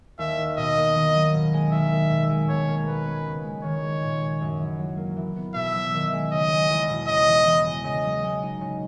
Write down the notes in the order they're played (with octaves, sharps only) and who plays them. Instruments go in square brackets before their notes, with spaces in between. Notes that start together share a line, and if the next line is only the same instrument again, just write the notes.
[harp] D#2 [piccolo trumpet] E5
[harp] D#3
[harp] B2 [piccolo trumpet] D#5
[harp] A#3
D#3
F#3
B2
G#3
[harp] D#3 [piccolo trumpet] E5
[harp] A#3
B2
G#3
[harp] B2 [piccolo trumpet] C#5
[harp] A#3
[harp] G#3 [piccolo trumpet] B4
[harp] C#4
C#3
G#3
[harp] D#3 [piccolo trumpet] C#5
[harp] G#3
A#2
G#3
F#2
E3
F#3
A#3
E3
B3
[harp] B2 [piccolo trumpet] E5
[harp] F#3
D#3
G#3
[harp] C#3 [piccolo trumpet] D#5
[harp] G#3
E2
B2
[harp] C#3 [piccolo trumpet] D#5
[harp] E3
E3
G#3
[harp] C#3 [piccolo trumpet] D#5
[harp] F#3
G#3
D#4
C#3